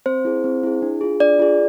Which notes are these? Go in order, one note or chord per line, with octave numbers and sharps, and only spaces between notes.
C4 C5
E4 G#4
C4
E4 G#4
D4
F4 G#4
D4 D5
F4 G#4